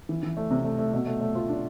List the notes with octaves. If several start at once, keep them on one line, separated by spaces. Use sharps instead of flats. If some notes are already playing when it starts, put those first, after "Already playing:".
E3
E3
A3
C3
A3
A3
B2
A3
A3
F4
D4